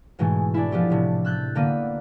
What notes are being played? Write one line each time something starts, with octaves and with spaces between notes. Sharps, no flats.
G#2 B2 E3 G#3 A3
D4 E4
F3 B3 G4 A4
A2 C3
E6 F#6 G6 A6
D3 A#3 B3 E6 D#7